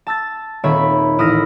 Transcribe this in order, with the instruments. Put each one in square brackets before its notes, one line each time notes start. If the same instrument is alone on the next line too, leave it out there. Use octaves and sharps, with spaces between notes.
[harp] A5 E6 A6
D#1 D#3 C4 C#5 E5 B5
A1 E4 D#6 F6 A#6